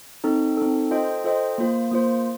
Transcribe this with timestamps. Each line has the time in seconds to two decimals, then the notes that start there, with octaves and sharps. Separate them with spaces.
0.24 C4 D#4 A4
0.57 C4 D#4 A4
0.91 F4 A4 C5 D#5 G5
1.24 F4 A4 C5 D#5 G5
1.58 A#3 F4 C5
1.92 A#3 F4 C5